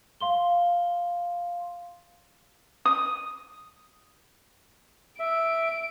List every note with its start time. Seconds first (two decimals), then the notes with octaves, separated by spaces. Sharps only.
0.21 F5 C6 G7
2.85 D#6
5.20 E5 D7